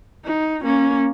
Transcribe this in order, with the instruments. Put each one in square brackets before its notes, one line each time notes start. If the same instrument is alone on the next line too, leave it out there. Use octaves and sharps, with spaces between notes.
[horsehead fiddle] D#4
A#3 C#4